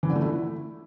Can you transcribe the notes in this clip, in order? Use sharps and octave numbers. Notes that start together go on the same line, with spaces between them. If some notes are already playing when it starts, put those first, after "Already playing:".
E3
D3
A3
E4